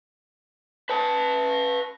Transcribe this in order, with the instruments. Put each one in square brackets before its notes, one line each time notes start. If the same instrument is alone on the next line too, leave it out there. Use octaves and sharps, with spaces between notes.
[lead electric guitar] B4 A5